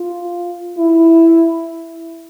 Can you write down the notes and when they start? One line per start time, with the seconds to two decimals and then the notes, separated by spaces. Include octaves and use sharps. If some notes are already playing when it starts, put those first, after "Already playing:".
Already playing: F4
0.78 E4